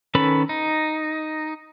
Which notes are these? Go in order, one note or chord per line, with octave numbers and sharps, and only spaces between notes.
D#3 C#4 A4 B4 B5
D#4